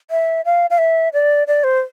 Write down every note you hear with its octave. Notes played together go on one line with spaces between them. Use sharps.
E5
F5
F5
E5
D5
D5
C5